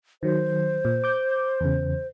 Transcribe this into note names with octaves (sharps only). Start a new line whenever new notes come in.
D#3 F#3 C5
A#2
D6 G6
E2 C#3